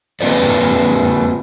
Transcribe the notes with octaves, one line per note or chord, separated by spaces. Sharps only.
A#3 C4 F4 B4 C#5 D5